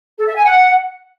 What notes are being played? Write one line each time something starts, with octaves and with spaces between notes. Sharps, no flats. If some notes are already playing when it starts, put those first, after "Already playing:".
A4
E5
G#5
F#5